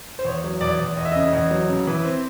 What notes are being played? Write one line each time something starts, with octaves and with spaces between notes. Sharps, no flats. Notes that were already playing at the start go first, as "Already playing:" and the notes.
C5
E2 C#5
F#3
E2 D5
E2
E2 D#5
E5
C#3 D#5
E2
F#3
C#3
E3
C4